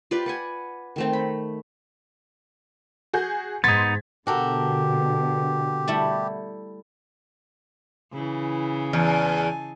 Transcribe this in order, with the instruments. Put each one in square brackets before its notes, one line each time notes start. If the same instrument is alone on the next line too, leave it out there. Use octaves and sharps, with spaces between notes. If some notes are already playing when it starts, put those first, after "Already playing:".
[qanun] F4 G4 B4 D5
B4 F#5 G#5
D#3 A3 C4
B5
[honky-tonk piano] F#4 G#4 G6
[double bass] G#2 [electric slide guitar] B3 D#4 [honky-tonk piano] C6 G#6 B6 [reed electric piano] A6
[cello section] B2 D3 [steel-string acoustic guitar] F#4 A4 A#4 [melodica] G4
[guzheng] G3 A3 E4
[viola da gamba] C#3 [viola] E3 E4
[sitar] E2 [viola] G#5 A5